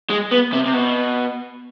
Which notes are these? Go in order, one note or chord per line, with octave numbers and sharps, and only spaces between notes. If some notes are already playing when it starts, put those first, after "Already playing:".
G#3
B3
C3
C3
B2